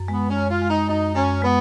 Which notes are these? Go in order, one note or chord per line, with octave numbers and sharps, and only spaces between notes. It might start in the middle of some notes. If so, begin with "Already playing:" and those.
Already playing: F#2
G#3 B3
C#4
F#2
F4
G#3
D#4
F#2 D#4
F#2 C#4
G#3 B3